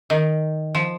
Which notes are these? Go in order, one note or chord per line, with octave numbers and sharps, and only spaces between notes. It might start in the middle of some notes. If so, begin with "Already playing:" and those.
D#3
F3